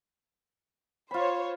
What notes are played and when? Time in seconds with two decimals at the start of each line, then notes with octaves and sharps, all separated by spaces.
1.11 F4 C5 C#5 B5